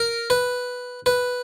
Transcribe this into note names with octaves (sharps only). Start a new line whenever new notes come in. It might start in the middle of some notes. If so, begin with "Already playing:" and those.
Already playing: A#4
B4
B4